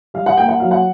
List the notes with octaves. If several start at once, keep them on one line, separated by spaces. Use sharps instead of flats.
G3 F5
F#5
A#3 G5
F#5
F#3 F5
F#5